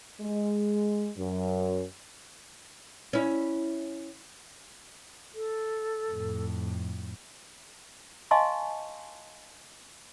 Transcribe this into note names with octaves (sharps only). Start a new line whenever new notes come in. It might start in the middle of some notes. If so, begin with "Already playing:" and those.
G#3
F#2
C#4 E4
A4
F2 A2
D#5 F5 G#5 A5 C6 C#6